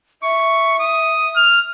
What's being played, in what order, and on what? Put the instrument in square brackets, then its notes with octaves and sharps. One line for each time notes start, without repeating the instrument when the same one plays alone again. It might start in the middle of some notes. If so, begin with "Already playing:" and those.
[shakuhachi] E5 [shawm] C#6
[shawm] D#6
[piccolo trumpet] F6